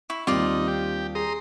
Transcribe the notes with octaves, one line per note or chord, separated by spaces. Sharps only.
E4 C#6
D#2 G3 C4 D#4 F4 D5
G4
G#4 A#5 C6 D#6